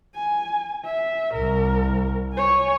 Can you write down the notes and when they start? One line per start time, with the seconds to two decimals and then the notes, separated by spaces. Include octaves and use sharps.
0.15 G#5
0.85 E5
1.34 C2 A#4
2.34 C#5 G#5